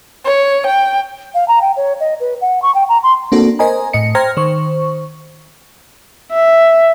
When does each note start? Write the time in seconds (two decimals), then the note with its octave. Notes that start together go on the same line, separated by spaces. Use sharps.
0.25 C#5
0.67 G5
1.35 F5
1.48 A#5
1.62 G5
1.77 C#5
2.00 D#5
2.20 B4
2.41 F#5
2.62 C#6
2.75 G5
2.89 A#5
3.03 C6
3.32 A#3 C4 D4 F#4 A4
3.59 A#4 C5 D#5 G#5 A#5
3.93 A2 D#5 C#7
4.15 C5 G5 A#5 F6 G#6 A#6
4.37 D#3 C5 C#6
6.33 E5